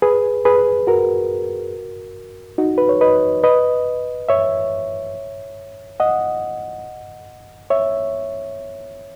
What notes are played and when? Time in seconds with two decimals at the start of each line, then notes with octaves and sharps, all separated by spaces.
0.02 G#4 B4
0.45 G#4 B4
0.87 F#4 A#4
2.58 D#4 F#4
2.78 B4
2.89 C#5
3.01 B4 D#5
3.43 B4 D#5
4.29 C#5 E5
6.00 D#5 F#5
7.70 C#5 E5